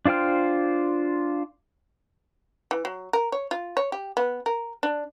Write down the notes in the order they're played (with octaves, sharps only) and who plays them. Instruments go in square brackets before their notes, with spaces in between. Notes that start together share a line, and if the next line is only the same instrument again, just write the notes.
[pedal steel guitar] D4 F4 C5 G5 F6
[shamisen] E3
F#3
A#4
C#5
F4
C#5
G4
B3
A#4
D4